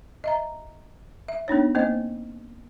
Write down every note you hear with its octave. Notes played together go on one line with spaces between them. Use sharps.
D#5 E5 A#5
E5
B3 D4 D#4 C#5
A#3 C4 C5 D#5